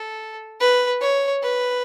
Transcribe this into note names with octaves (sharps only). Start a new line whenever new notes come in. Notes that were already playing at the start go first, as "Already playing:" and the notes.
Already playing: A4
B4
C#5
B4